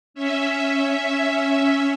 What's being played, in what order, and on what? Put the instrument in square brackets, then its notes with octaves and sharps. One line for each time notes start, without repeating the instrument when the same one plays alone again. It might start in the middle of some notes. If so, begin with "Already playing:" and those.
[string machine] C#4 E5